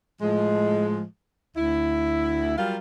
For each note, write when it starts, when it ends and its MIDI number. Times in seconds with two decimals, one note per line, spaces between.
0.21 1.03 45
0.21 1.03 53
0.21 1.03 56
1.57 2.56 38
1.57 2.56 64
2.57 2.77 54
2.57 2.77 55
2.57 2.77 65
2.57 2.77 70
2.57 2.77 77